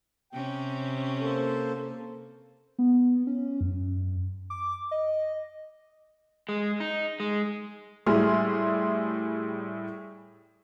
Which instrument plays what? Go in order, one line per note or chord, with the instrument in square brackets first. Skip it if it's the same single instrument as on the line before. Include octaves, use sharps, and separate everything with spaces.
[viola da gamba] C3 C#4 [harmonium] G5
[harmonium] A#3 A4 C5
[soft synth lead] B3
C#4
F#2
D6
D#5
[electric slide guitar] G#3
D#4
G#3
[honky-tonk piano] A2 G3 E4 G#4 C6 F6